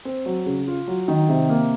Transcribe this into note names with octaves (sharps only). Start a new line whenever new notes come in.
C4
F#3
C#3
F4
F#3
D#3
C3
A#3